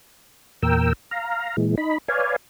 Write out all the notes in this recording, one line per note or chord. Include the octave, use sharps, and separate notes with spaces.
E2 A#2 A#4 G5 E6
F5 A#5
A#2 E3 G#3
D#4 B5
B4 C#5 D5 F5 G#5